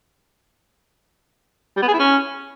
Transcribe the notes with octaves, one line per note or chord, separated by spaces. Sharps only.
G3
B3
G#4
E4
C#4